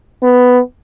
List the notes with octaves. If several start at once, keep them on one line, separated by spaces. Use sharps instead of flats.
B3